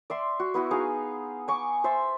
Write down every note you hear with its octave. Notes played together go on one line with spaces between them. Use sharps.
D5 E5 C6
F#4
B3 E4 F#4
D#4 G#4 F5
G#5 C#6 D6
C5 E5 A5